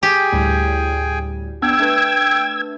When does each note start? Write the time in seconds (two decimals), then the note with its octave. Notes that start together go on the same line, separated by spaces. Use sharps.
0.03 G4 G#4 G5 G#5
0.33 D2 A2 G3
1.62 B3 D4 G5 E6 G#6
1.79 A3 D4 B4